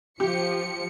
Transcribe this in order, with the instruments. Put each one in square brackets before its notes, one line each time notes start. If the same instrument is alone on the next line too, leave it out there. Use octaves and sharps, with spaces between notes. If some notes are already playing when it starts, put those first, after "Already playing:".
[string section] F3 C#7 [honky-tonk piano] G4